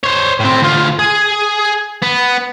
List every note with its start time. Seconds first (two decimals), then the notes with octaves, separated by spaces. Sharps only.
0.04 C5 C#5
0.40 A2 C4
0.62 D2 F4
0.99 G#4
2.03 B3